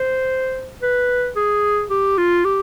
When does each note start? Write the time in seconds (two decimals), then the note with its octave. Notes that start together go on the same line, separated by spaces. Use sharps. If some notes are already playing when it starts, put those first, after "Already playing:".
Already playing: C5
0.82 B4
1.36 G#4
1.90 G4
2.18 F4
2.45 G4